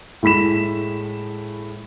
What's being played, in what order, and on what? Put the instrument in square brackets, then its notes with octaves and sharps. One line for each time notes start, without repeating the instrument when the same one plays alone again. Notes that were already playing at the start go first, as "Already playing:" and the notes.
[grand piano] A2 G#3 B5 B6 E7